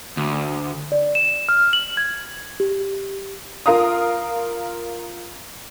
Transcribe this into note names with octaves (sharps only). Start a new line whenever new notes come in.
D2
D5
E7
F6
F#7
G#6
G4
F4 A#4 F5 A#5 D#6